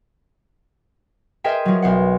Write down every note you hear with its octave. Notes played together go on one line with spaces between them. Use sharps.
G#4 A#4 C5 D#5 E5 G5
F3 F#3
B1 C5 F#5